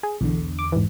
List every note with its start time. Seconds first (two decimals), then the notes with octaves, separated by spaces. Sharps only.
0.03 G#4
0.21 B1 E2 D3
0.59 D6
0.72 G#2 E3